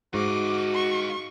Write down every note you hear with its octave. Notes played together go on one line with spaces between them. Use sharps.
G#2 D#4 F4 F#4 D6
C#6